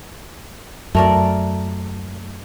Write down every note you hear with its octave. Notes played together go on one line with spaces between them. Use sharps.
F#2 A3 A#4 D5